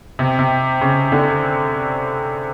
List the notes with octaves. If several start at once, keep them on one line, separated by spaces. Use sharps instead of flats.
C3
C3
C#3
D3